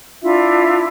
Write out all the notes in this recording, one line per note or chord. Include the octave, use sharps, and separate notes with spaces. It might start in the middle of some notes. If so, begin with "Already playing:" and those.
D4 E4 F4 E5